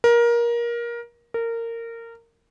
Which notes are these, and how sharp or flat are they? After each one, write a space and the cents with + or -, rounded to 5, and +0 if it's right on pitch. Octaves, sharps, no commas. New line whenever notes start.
A#4 +20
A#4 -20